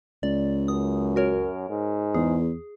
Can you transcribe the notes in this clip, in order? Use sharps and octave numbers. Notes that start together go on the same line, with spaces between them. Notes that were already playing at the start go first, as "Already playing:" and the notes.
C#2 D5
F#2 D#6
F#4 A#4 C#5
G#2
E2 G#4